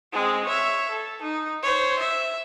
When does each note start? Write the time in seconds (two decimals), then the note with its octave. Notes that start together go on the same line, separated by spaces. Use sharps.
0.13 G#3 C4
0.45 C#5 E5
0.91 A4
1.22 D#4
1.63 C5 C#5
1.99 E5